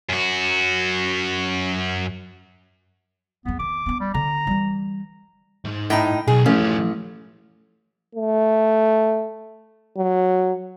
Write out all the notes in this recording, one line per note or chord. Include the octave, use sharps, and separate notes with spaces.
F#2 F#4
F2 G#3 B3
D#3 D6
B3 D4
G3
D3 A#5
E3 G3
G#2
A2 D#4 G5
B1 G#4
A1 F3 A3 C#4
A3
F#3